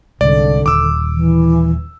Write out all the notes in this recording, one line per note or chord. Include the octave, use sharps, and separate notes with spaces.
C2 G#2 D3 D5
D#1 D6 E6
E3